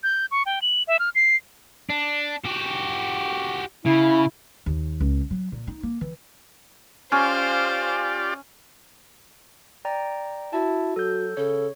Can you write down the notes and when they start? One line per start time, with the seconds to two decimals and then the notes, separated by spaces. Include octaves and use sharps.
0.03 G6
0.31 C#6
0.46 G5
0.62 F#7
0.87 E5
0.99 F6
1.15 C7
1.90 D4
2.45 F#4 G4
3.86 C#3 E4
4.66 D#2
5.00 C#2
5.31 F#3
5.52 A#2
5.67 D#4
5.83 A#3
6.01 E3
7.12 C#4 F4 G4 C5 D5 F5
9.85 D5 G5 A#5
10.53 E4 F#4 A5
10.96 F#3 A4 G6
11.37 C#3 A4 C#5